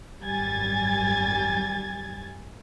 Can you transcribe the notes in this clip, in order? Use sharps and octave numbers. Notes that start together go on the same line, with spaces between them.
G#1 F#2 G3 G#5 G#6 A6